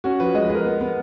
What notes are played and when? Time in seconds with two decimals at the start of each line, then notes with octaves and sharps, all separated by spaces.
0.04 C#4 F#4
0.20 F3 B4
0.34 G#3 D#5
0.45 B4
0.49 G#3
0.55 A#4
0.65 B3
0.81 B3